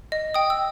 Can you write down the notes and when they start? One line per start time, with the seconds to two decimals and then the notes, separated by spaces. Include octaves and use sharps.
0.12 D#5
0.34 G5 D#6
0.50 E6